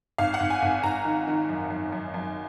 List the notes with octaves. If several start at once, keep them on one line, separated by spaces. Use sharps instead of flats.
G#1 F5
F#5
G#1
G#5
G#1
G#1 A#5
D#3
D#3
F#2
F#2
F#2
F#2